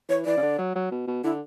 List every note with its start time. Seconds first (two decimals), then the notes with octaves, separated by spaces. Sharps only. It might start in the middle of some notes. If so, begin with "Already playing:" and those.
0.09 E3 C#5
0.25 E3 D5
0.37 C#3
0.42 D3
0.59 F#3
0.75 F#3
0.91 B2
1.07 B2
1.24 D3 E4